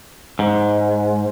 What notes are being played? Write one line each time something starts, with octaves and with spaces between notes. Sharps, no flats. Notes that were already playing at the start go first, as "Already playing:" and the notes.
G#2